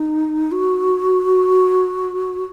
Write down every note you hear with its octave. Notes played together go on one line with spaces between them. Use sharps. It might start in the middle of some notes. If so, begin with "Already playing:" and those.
Already playing: D#4
F#4